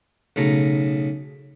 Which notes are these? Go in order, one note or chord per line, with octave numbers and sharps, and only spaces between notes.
B1 C#3 A3 A#5